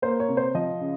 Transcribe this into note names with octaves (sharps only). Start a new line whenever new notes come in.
A#3 C5
C#5
C3
C5
F3 D#5
C#3